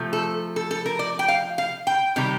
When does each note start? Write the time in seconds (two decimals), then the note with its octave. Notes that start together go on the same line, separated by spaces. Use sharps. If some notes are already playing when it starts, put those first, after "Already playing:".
Already playing: C3 F3 A3
0.13 A4
0.56 A4
0.71 A4
0.86 A#4
0.99 D5
1.19 G5
1.28 F5
1.58 F5
1.87 G5
2.16 C3 D#3 G3